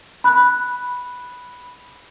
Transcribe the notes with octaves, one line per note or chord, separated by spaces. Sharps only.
B5 F#6